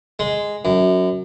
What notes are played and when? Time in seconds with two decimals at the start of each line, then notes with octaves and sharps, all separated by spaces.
0.19 G#3
0.65 F#2